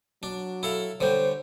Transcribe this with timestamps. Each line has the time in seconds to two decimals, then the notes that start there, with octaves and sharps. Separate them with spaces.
0.23 F#3 D4
0.63 E4 A4 F5
1.01 D3 G3 C5 C#5